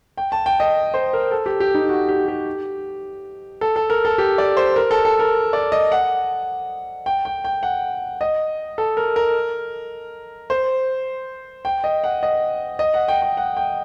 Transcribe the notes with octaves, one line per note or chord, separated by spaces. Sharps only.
G5
A5
G5
D#5
C5
A#4
A4
G4
G4
D#4
F#4
G4
G4
A4
A4
A#4
A4
G4
D5
C5
A#4
A4
A4
A#4
D5
D#5
F#5
G5
G5
G5
F#5
D#5
A4
A#4
A#4
C5
G5
D#5
F#5
D#5
D#5
F#5
G5
G5
F#5
G5